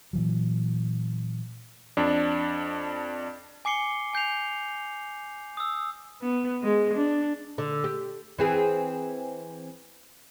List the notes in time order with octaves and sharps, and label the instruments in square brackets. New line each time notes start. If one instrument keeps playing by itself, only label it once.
[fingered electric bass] A#2 E3 F#3
[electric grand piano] F2 D4
[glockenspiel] G#5 D6 C7 C#7 G7
G#5 G6 C7 F7
D#6 E6
[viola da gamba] B3
G#3
D4
[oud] D3
G4
E3 C4 G#4